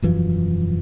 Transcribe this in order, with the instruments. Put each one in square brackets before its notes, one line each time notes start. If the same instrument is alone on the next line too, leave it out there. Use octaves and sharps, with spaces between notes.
[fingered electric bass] E1 F#2 E3 F3